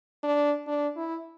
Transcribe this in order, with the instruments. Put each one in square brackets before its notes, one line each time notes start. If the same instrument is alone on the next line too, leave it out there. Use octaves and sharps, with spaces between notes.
[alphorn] D4
D4
E4